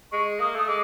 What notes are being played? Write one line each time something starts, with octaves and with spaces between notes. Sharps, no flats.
G#3 C#6
A#3 D#6
A3 D#6
G#3 D6